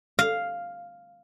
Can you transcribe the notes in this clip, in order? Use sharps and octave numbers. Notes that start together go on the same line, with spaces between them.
F5